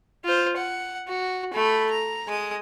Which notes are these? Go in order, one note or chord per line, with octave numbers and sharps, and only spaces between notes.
F4 C5
F#5
F#4
A3 B5
A#5
G#3 D#6